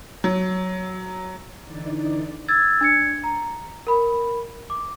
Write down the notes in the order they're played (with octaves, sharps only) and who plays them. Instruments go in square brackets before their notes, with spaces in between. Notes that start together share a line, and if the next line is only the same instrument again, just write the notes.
[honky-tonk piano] F#3
[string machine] D3 E3 D#4 D5
[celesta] E6 G#6 A6
D4 G#6 C#7
A#5
A#4 B5
D6